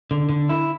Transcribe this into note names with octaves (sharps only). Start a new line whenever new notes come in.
D3
D3
E4